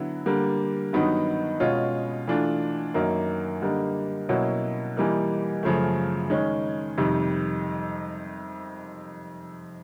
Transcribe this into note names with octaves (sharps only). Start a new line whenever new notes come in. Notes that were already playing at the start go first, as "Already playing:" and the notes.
Already playing: D3 F#3 B3 E4
D3 G3 A#3
G2 D#3 F#3 B3 D#4
B2 G#3 C#4 F4
E3 A3 D4 F4
F#2 D#3 F#3 A#3 D#4
D3 G3 A#3 D#4
B2 F#3 A#3 C#4 E4
E3 G3 A#3 D#4
F#2 C#3 F3 A3
D#3 G#3 C#4
F2 C3 D#3 G3